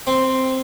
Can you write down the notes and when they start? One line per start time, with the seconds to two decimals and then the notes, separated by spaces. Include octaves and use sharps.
0.07 C4